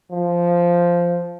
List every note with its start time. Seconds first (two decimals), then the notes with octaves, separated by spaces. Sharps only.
0.11 F3